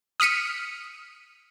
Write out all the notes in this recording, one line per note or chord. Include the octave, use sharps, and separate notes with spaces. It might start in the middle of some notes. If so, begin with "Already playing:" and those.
D#6 F6 B6 C#7 D#7